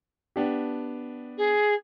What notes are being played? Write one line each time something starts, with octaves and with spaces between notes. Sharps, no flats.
B3 D4 G4
G#4